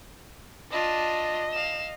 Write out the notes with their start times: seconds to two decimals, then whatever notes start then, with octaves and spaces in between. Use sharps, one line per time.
0.71 D4 F4 D#5
1.52 F5 E7